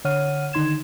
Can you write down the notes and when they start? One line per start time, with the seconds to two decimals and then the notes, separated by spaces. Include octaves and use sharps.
0.05 D3 C#5 F#5 F6 D#7
0.53 D3 D#3 D#4 C6 G#6 E7